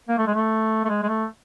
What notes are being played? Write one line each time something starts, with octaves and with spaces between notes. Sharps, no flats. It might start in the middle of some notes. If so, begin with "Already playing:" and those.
A#3
A3
G#3
A3
A3
G#3
G#3
A3